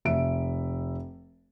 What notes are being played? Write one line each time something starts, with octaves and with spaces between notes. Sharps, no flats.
F1 E5 D7